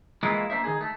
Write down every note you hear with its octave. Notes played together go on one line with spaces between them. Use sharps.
E3 G#3 A#3 E4 F4
A#3 D4 C5 E5
D#3 D#4 G#4
A3